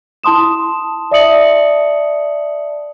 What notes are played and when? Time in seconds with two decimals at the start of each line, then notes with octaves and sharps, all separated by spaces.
0.23 E4 A5 C6 D#6 E7
1.11 D5 E5 A5 D#6 C#7 F#7